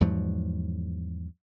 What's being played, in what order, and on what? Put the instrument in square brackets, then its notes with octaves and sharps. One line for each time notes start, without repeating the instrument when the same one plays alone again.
[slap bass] E2 G#2 F3 F#3